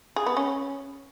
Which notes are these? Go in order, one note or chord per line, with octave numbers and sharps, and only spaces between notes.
G#4
B3
C#4